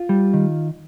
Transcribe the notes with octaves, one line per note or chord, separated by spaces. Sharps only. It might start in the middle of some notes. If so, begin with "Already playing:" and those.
Already playing: F4
G3
D#3